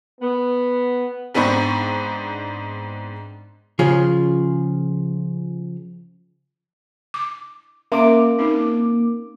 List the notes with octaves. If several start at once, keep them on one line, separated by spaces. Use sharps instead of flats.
B3
G#2 B3 C4 D4 B5 C#6
C#3 F3 C#4 F4 G#4
D6
A#3 C#4 E5 C6 D6
C4 D#4